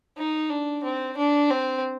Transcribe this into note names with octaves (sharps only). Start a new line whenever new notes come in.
D#4
D4
C4
D4
C4